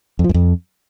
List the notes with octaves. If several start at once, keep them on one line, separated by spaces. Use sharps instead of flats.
F2
F3
F#2
F2